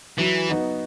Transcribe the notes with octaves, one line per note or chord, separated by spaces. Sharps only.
E3 F#3
B3 D#4 F#4